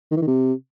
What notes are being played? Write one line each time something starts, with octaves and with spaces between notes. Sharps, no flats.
D#3
E3
D#3
C3